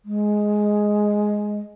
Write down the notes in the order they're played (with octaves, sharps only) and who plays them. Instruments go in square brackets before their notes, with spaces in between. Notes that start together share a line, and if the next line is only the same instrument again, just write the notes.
[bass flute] G#3